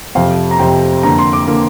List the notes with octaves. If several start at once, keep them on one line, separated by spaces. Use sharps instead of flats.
F2 C3 F3 C4 F5
A#5
F2 C3 F3 C4 G5
F2 D3 A#3 A#5
C6
D6
D3 A#3